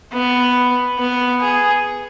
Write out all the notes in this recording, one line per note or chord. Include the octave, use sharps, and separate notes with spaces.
B3
B3
G#4